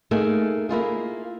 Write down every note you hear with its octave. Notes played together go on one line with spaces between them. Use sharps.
A3 A#3 D#4 G#4 A4
A#3 E4 F4 G#4